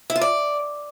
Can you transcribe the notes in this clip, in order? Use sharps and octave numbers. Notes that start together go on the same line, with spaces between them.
E4
F4
D5